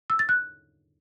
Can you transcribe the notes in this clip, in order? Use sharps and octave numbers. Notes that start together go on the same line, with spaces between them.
E6
A6
F#6